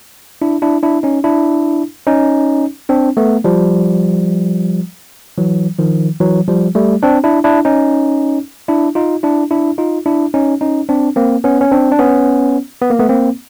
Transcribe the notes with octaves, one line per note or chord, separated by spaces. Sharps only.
D4 E4
D4 E4
D4 E4
C#4 D#4
D4 E4
C#4 D#4
C4 D4
A3 B3
F3 G3
E3 F#3
D#3 F3
E3 F#3
F3 G3
G3 A3
C4 D4
D4 E4
D4 E4
C#4 D#4
D4 E4
D#4 F4
D4 E4
D4 E4
D#4 F4
D4 E4
C#4 D#4
C#4 D#4
C4 D4
A#3 C4
B3 C#4
C#4
C4 D4
D4
B3 C#4
B3
A#3
A3 B3
A#3 C4